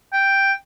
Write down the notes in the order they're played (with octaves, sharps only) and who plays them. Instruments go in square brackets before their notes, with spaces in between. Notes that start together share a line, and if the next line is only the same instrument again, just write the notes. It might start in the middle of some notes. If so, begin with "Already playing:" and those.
[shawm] G5